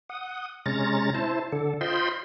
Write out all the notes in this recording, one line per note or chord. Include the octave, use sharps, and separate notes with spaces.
F#5 D#6
C3 G#3 C#4 A#5 A6
E4 C5 A5
D3 A4
F4 C5 D#5 G5 B5 C6